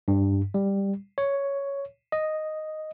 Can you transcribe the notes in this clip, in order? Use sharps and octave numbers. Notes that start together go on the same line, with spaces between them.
G2
G3
C#5
D#5